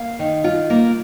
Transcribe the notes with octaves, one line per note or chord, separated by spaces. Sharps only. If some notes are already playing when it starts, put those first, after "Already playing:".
Already playing: A#3 F5
D#3
F4
A#3